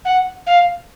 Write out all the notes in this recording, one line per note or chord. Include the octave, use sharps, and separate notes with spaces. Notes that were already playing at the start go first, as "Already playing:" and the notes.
F#5
F5